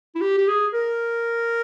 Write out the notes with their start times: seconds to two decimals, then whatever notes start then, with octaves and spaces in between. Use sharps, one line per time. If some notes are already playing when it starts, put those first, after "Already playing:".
0.15 E4
0.21 G4
0.38 G4
0.48 G#4
0.74 A#4